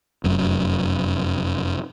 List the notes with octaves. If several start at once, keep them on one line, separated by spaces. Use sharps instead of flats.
F1 F#2